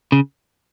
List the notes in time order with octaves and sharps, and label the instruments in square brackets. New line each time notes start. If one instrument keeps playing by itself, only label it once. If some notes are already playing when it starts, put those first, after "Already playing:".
[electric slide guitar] C#3